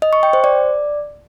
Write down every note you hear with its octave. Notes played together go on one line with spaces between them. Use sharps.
D#5
C#6
G5
C5
D5